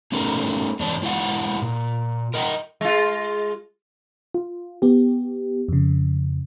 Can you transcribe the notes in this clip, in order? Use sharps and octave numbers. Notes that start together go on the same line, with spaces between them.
A3 C#4 D#4 G4 A4 A#4
E2 G#3 D4 C5 C#5 A5
G#3 E4 F4 G4 F5 F#5
A#2
A#4 D#5 F#5 G5
G#3 F4
F4
B3 G4
F2 C#3